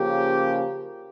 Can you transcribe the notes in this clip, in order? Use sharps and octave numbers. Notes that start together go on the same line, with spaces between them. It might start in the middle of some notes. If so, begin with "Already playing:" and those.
Already playing: C#3 F3 A#3 C#4 G4